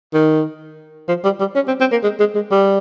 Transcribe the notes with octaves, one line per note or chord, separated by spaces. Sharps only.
D#3
F3
G3
G3
C#4
C4
C4
A#3
G#3
G#3
G#3
G3